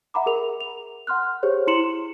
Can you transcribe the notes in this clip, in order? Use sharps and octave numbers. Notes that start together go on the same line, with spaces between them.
E5 F#5 A#5 B5 D6
G#4 A#4 F7
F7
F#5 C6 F6 F#6
G4 G#4 C5 C#5
E4 C6 C#7 E7 F#7